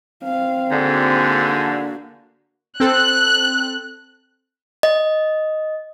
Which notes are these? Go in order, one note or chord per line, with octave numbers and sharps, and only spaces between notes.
C4 F5
G#2 D3 A#3 F#4
C4 A4 F#6
D#5